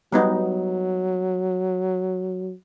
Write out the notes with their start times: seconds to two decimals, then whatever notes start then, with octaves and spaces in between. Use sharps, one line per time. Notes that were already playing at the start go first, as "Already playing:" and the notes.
0.12 F#3 G3 B3 D#4